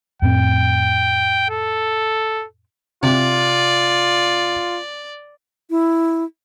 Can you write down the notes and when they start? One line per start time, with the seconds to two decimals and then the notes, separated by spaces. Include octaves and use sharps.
0.22 F2 A2 C4 G5
1.50 A4
3.03 C3 F4 D5
5.70 E4